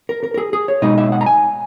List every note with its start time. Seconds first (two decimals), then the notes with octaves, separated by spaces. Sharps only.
0.09 A#4
0.23 A#4
0.34 A#4
0.38 G#4
0.53 G#4
0.68 C#5
0.82 B2 G#3 D#4 D#5
0.98 E5
1.12 F#5
1.21 A#5
1.26 G#5